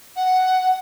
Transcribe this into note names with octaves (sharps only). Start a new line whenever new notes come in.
F#5